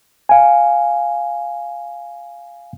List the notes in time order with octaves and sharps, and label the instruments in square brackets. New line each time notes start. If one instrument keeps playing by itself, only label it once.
[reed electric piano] F5 G#5